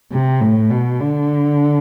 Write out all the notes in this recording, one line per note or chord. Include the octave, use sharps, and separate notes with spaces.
C3
A2
B2
D3